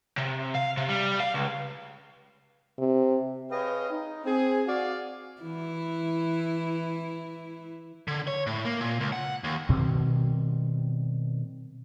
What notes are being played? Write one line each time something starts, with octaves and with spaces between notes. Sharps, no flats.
C3
F5
C3
G3
F5
C#2
C3
G#4 B4 C#5 D#5 F5 G5
D#4
C4 G#4
F#4 D5 F5
E3 E4
D3
C#5
A2
A#3
A#2
C#2
F#5
D#2
B2 D#3 G3 C4